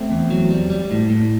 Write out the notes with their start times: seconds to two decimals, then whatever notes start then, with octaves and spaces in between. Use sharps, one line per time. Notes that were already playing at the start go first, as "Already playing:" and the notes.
Already playing: A3 C4
0.11 E2
0.30 F#3
0.51 G3
0.70 G3
0.91 A2
1.10 A2